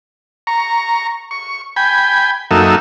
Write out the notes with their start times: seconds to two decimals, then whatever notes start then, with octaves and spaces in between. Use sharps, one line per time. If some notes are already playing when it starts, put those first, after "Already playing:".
0.47 A#5 C#6
1.31 C#6
1.76 G5 G#5 B5
2.51 F#2 F#3 A#3 D#4 A4 E5